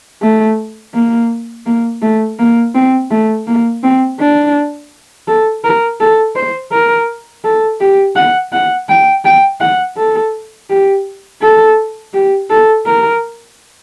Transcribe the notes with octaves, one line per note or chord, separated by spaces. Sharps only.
A3
A#3
A#3
A3
A#3
C4
A3
A#3
C4
D4
A4
A#4
A4
C5
A#4
A4
G4
F#5
F#5
G5
G5
F#5
A4
G4
A4
G4
A4
A#4